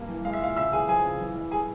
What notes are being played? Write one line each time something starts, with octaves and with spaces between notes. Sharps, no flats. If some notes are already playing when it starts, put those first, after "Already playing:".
Already playing: G2 A#3
E3
G#3 F5
E5
A#2 F5
C#3 E5 E6
E2 G#4 G#5
F3 G#4 G#5
C#3
E3
E2
G3 G#4 G#5